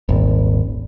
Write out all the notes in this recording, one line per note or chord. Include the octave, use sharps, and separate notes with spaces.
D#1 G#1